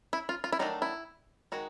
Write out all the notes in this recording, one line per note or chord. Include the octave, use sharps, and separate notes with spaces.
E4
F4
F4
E4
D#3 F#3 A3 D4 D#4
E4
D#3 G#3 F#4